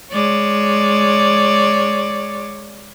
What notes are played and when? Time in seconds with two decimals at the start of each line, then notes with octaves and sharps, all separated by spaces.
0.13 G#3 C#5 D5